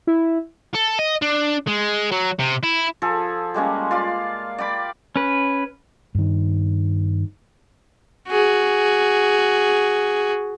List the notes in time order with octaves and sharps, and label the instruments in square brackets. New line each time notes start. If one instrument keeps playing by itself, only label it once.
[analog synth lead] E4
[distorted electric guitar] A4
D#5
D4
G#3
F#3
C3
E4
[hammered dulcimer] F3 G#4 A4
G3 G#3 A#3 C#4
F4 D5 F5
D5 G5 B5 D6
[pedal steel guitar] C#4 B4
[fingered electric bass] G2 D#3
[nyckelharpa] F#4 G#4